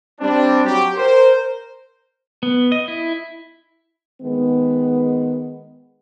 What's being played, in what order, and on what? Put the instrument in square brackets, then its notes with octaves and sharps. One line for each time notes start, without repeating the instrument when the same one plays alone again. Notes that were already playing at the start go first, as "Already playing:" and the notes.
[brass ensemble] G3 C4 D4
F#3 G4
A#4 C5
[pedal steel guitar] B3
D#5
E4
[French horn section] D#3 G#3 B3